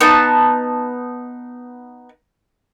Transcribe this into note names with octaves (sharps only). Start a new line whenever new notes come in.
B3 D#4 A5